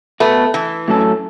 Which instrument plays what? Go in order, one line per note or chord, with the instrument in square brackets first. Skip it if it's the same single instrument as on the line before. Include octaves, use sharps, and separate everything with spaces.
[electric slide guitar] B2 B3 F#4 B4 [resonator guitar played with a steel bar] A3
[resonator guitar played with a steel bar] E3
[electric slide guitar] A2 F#3 C#4 A4